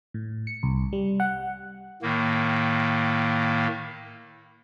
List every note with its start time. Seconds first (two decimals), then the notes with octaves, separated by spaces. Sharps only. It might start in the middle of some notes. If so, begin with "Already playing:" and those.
0.14 A2
0.47 C#7
0.63 C2
0.93 G3
1.20 F#5
2.02 A2 D#3 A#3